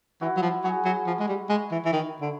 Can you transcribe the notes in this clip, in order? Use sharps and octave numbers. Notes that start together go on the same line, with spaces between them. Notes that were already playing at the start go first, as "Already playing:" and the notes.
E3 E4 F#4
F#3
F3
F#3 F#4 G#4
F#3
F3
G#3
G3
G#3
E3
E3
D#3
D3